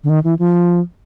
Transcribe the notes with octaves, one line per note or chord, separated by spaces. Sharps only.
D3
D#3
E3
F3